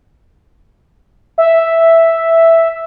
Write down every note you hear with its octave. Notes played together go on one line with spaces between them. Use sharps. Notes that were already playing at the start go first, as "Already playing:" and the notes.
E5